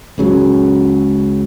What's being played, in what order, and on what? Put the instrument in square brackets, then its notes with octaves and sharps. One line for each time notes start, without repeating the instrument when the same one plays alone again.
[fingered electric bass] C#2 C#3 F#3